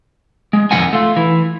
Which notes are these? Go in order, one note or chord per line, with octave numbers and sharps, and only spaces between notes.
G#3
F2 D#3 E3 F4 F#5 G#5
A3 F4
E3